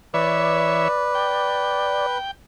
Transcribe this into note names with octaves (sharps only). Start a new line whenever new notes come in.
E3 B4 C#5 D5 E5
G5